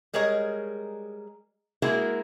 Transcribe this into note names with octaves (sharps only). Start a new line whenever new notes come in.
G3 G#3 G#4 A#4 C#5 D#5
G#3 A#3 E4 F#4 G#4 A#4